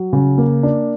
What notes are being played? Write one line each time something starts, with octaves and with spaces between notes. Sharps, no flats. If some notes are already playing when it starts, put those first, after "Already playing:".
Already playing: F#3
C#3
A#3
D4